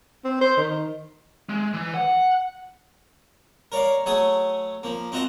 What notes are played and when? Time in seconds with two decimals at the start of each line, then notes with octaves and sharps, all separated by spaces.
0.24 C4
0.41 C5
0.57 D#3
1.49 G#3
1.73 E3
1.94 F#5
3.72 A#4 C#5 D5 F5
4.06 F#3 A3 G#4 G#5 D#6
4.83 F3 A#3
5.12 C4 F4 F#4 D#5 A5